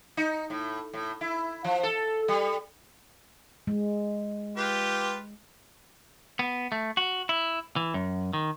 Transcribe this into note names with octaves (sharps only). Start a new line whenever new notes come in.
D#4
A2
A2
E4
F3
A4
G3
G#3
F4 G4 B4
B3
A3
F#4
E4
E3
F#2
D#3